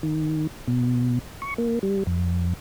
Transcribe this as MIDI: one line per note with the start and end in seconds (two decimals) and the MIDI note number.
0.03 0.47 51
0.68 1.19 47
1.42 1.54 85
1.58 1.79 58
1.83 2.03 55
2.07 2.53 41